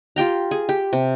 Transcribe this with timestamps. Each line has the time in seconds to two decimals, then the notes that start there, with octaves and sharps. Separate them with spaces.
0.16 F4 G4 G5 A#5
0.51 G#4
0.69 G4
0.93 C3